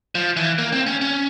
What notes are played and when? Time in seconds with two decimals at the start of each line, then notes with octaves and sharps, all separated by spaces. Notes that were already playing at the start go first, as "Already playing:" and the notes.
0.15 F3
0.37 E3
0.58 A#3
0.72 C4
0.86 C#4
1.01 C#4